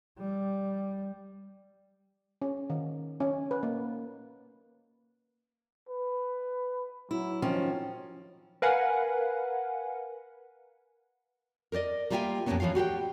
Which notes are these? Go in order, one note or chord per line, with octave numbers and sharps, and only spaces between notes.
G3
C#4
D#3
C#4
B4
A#3
B4
F#3 E4
D#3 F3 C#4
A#4 B4 F5 F#5 G#5
A#4 C5 D5 D#5
G3 A#3 F4 E5 G5 G#5
F2 A#2 D#3 A#3 B3 C#4
E3 F3 F4 C#5 F5
F#4 G4 F5 G5